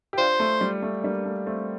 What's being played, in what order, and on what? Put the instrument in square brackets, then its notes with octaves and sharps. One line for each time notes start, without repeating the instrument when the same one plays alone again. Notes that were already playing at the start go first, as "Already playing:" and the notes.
[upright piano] G4
[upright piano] D4 F4 [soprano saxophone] C5
[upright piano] A3
G3
A3
G3 A#3
A3
A3 C4